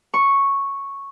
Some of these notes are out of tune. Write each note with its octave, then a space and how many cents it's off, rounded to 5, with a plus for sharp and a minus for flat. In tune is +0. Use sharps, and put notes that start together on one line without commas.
C#6 -5